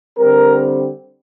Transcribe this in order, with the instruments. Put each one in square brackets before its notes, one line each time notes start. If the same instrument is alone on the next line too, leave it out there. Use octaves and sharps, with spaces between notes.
[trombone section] D3 G3 C4 A#4